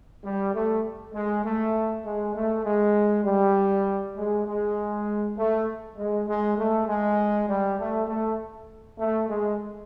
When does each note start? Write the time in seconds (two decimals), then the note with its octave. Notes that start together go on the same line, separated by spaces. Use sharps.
0.23 G3
0.53 A3
1.14 G#3
1.43 A3
2.04 G#3
2.35 A3
2.65 G#3
3.24 G3
4.15 G#3
4.46 G#3
5.36 A3
5.97 G#3
6.27 G#3
6.57 A3
6.86 G#3
7.48 G3
7.78 A3
8.07 A3
8.98 A3
9.28 G#3